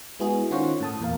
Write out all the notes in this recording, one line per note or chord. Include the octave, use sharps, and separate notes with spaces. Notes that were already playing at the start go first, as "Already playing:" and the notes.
G#3 B3 E4 F#4 G#4
D#3 C#4 F4 C5 C#5 F#5
A2 A5 D#6
E2 A#2 A#4 F5